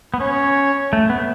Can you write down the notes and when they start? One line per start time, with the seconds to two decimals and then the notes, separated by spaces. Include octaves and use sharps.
0.14 B3
0.20 C#4 C#5
0.93 A3
1.10 B3